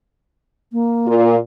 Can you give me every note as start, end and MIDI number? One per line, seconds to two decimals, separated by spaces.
0.72 1.35 58
1.07 1.38 46
1.07 1.38 65